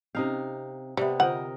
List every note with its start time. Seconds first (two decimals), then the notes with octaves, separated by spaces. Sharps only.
0.15 C3 C4 C#4 D#4 F5
0.97 C3 G3 B3 G4 D5 E5
1.20 D3 F4 A#4 C5 D#5 F#5